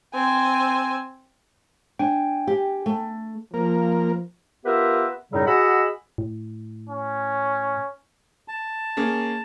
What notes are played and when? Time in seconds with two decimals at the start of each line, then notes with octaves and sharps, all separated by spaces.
0.14 C4 G#5
1.99 D4 G5 G#5
2.47 G4
2.86 A3
3.54 F3 A#3 A#4
4.65 B3 F4 G4 A#4 B4 E5
5.32 F#2 A2 C#3 F#3 G3 D#4
5.46 F#4 G#4 D#5 F#5 B5 E6
6.18 A2
6.89 C#4
8.48 A5
8.97 A#3 C#4 G#4